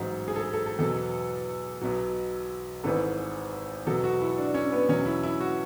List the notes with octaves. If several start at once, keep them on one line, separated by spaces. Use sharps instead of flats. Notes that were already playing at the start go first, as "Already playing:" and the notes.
Already playing: A1 G#2 F#3
G#4
A4
G#4
A4
A4
E2 B2 F#3 A4
B1 B2 F#3
G#1 G#2 E3 A4
E2 B2 F#3 A4
F#4
E4
D4
C#4
B3
E2 B2 F#3 C#4
E4
E4
F#4